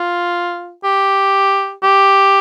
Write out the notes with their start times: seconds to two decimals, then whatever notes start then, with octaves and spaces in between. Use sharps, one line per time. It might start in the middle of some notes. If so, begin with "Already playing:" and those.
Already playing: F4
0.84 G4
1.83 G4